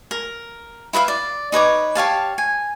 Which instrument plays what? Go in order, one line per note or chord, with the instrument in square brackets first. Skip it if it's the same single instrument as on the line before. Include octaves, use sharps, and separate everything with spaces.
[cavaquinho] A#4
E4 B4 E5 F5
D5
D#4 B4 C#5 D6
G4 C#5 F5 A5
G#5